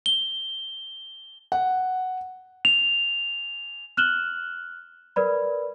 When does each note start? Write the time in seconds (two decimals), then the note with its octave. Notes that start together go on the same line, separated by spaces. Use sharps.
0.06 G7
1.52 F#5
2.65 F7
3.97 F6 F#6 E7 F#7 G7
5.16 A#4 B4 D5 B5